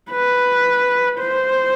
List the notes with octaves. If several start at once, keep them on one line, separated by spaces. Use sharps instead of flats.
B4
C5